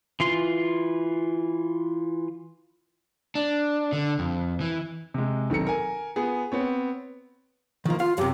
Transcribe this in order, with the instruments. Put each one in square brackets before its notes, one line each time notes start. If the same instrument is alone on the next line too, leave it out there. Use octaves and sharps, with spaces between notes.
[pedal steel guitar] E3 F4 C6
[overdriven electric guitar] D4
D3
F2
E3
[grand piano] C3 G#3
B1 D#3 C4 A4 A#5 C#7
A#4 G#5
B3 F4 G#4
B3 C4 C#5
[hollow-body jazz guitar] D#3 A#3 [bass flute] F3
[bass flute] F4 [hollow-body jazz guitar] F5
[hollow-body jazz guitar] F#2 C3 [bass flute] G4